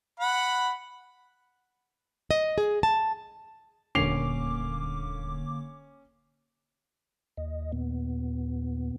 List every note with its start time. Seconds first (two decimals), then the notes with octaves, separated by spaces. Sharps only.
0.19 F#5 B5
2.31 D#5
2.58 G#4
2.83 A5
3.95 D#1 D2 D3 A#3 C#4 D6 C7 F7
7.37 D#2 D#5
7.72 A#2 B3